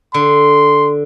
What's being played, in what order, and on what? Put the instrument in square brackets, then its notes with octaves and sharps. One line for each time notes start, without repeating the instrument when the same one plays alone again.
[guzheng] D3 [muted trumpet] C6